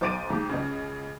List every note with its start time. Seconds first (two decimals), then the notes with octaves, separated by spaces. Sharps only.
0.01 B1 C5 D6 A6 D7 D#7
0.30 D#2 G#2
0.49 C#2 C#3